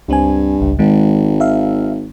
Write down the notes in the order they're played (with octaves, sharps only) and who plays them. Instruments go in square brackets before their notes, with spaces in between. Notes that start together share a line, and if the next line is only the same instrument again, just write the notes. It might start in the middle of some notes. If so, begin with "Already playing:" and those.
[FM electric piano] C#2 C4 G#5 [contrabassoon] G2
[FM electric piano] G#1 C#2
[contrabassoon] G#1 [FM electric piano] D#3 G#3
[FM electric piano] E5 F5